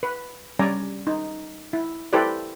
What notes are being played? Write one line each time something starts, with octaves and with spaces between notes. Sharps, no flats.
B4
G3 C#4 D5 G#5 A#5
D#4
E4
E4 G4 A4 B4 C5 D5